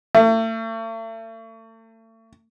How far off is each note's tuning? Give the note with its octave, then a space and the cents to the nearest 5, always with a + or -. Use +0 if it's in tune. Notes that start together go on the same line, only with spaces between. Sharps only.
A3 +40